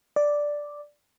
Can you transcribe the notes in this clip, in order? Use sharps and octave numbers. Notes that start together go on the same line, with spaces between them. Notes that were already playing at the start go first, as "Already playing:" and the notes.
D5